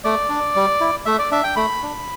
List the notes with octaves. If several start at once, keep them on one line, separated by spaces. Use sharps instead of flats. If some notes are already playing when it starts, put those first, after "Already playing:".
A3 D5
D4
G3
E4
A3 E5
D5
D4 E5
G5
A3 B5
D4